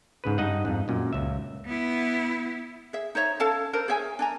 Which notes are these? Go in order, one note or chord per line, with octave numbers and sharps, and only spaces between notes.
G#2 C#3 B4
G2 D#4 D#5 F#5
F2 G#2
F#2 A#2
C#2 E5
B3 E4
G#4 E5
D#4 C5 C#5 E5
C#4 A4 F5 A5
D4 A#4 C5
G#4 C#5 E5 G#5
D4 G#5 A#5